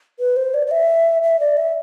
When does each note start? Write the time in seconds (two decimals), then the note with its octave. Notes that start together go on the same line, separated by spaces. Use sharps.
0.20 B4
0.37 C5
0.54 D5
0.67 D5
0.71 E5
1.23 E5
1.40 D5
1.57 E5